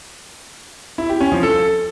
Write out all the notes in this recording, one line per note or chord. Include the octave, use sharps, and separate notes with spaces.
E4
G4
C#4
F3
A4